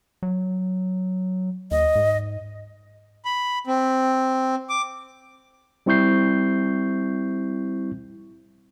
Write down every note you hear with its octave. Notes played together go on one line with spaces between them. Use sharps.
F#3
D#2 D#5
G#2
B5
C4
D6
G3 C4 E4 C#6 G6 C7